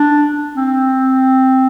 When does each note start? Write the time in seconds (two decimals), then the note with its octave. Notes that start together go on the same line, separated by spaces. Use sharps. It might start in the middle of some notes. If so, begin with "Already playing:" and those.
Already playing: D4
0.56 C4